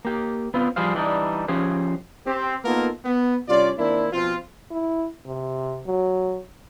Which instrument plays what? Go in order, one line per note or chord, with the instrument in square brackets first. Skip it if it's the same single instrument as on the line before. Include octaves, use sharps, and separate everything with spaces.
[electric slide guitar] A#3 G4
B3 C4 F4
F3 G3 G#4 C5 F5
E3 G3 D4 D#4
F3 C#4 G4 G#4 C5
[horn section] C4 G4
A#3 B3 D#4 F4 A4 A#4
B3
G2 C3 C#4 F4 D5
D#3 A#3 C4 D4 E4
B2 F3 C4 F4
[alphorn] E4
C3
F#3